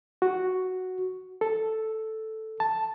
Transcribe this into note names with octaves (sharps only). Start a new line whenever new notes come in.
F#4
A4
A5